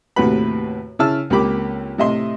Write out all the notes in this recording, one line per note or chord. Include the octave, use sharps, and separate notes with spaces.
D#2 A2 C3 F#4 B4 B5
C#3 E4 A5 E6 F6
C#2 A#3 C4 G4 B5 D6
A2 C3 D#5 E5 C6